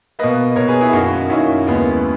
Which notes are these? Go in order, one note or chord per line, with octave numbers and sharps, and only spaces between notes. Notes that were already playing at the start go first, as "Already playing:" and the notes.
B2 A#3 B4 D#5
B2 A#3 A#4 C#5
G#4 B4
E4 G#4
F#2 D#3 A#3 D#4 F#4
F#2 D#3 A#3 C#4 E4
D#2 C#3 G#3 B3